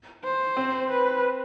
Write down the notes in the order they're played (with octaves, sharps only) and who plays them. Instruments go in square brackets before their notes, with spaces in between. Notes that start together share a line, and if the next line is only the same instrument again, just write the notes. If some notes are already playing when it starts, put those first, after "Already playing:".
[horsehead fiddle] C5
[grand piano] C4
[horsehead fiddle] B4